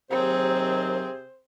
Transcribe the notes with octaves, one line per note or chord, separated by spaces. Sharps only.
D#2 C3 F#3 C4 G#4 C5